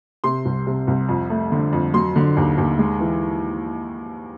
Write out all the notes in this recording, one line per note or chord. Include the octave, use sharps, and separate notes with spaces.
C3 C6
C2
C3
C2
F2
A3
D3
F2
F#3 C6
D3
D#2
D#2
G#3
E3